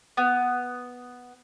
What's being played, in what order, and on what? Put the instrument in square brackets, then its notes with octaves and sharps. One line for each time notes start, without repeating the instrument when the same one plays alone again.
[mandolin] B3